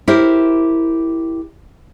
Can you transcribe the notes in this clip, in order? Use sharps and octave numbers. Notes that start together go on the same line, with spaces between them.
E4 G4 A#4 C5